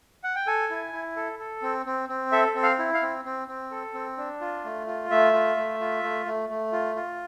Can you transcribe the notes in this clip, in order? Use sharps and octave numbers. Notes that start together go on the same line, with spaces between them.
F#5
G5
A4 G#5
E4
E4
A4
A4
C4
C4
C4
A4 E5
C4
F5
E4
F5
C4
C4
C4
A4
C4
D4
F4
A3
F4
A3 E5
F4
A3
F4
A3
A3
A3
F4
F4